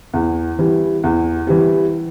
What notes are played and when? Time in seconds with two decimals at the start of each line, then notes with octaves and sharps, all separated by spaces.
0.13 E2
0.59 E3 G3
1.04 E2
1.47 E3 G3